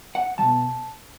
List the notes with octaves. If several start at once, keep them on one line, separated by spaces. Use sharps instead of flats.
F#5
B2 F#3 A5